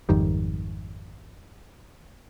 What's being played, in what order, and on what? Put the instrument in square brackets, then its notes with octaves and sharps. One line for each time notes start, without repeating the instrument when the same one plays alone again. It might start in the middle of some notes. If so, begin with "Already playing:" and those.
[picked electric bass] G#1 F2 D#3 G3